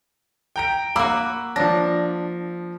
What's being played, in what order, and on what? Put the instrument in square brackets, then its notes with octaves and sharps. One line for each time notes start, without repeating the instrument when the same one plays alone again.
[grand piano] G5 A#5 D7
[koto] A#3 F#4 [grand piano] B5 D6 E6
[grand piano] F3 A#6 [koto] D4